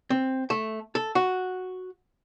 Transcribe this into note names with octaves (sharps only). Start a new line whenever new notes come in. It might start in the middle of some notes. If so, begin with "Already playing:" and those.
C4
A3
A4
F#4